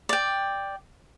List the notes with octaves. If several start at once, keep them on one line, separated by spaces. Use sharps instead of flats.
D5 G5